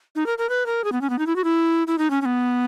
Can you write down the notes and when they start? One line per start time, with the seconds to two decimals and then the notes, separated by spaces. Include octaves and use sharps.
0.15 D#4
0.26 A#4
0.38 A#4
0.49 B4
0.66 A#4
0.84 G#4
0.92 B3
1.01 C#4
1.10 B3
1.19 D#4
1.27 E4
1.36 F#4
1.44 E4
1.87 E4
1.98 D#4
2.10 C#4
2.22 C#4
2.25 B3